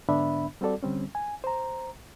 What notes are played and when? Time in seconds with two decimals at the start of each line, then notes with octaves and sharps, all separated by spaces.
0.09 G#2 D3 B3 D4 E5 B5
0.61 G3 C4 F#4 A4 D5
0.83 D3 G3 C4 C#4
1.15 G#5
1.44 C5 A#5